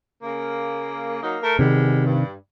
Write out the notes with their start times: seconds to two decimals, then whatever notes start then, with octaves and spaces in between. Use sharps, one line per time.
0.23 C#3 A#3
1.22 F#3 A#3 D#4
1.42 A3 A#4
1.59 E2 C3 D#3 G3 G#3
2.06 G2